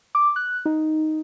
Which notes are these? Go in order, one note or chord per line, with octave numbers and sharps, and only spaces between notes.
D6
F#6
D#4